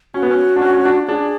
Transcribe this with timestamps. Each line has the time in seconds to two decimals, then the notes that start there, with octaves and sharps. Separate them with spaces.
0.14 C#4 F#4
0.22 B3
0.31 C#4
0.56 D4
0.62 C#4
0.73 C#4
0.85 D4
1.08 D4 G#4